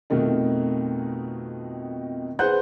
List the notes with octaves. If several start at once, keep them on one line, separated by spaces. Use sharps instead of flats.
F2 B2 D#3 A3 D#4
G#4 B4 C5 F#5 F#6 G6